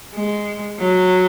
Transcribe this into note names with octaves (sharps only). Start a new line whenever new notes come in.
G#3
F#3